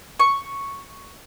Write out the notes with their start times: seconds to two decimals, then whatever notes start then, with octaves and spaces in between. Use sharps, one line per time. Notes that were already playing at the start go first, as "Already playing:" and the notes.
0.20 C#6